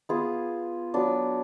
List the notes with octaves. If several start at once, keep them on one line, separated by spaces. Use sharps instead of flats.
B3 F4 G#4
F#3 B3 D4